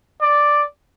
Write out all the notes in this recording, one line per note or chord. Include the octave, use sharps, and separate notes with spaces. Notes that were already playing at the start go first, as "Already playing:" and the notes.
D5